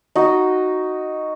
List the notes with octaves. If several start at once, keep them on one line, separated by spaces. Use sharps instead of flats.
D#4 F#4 D#5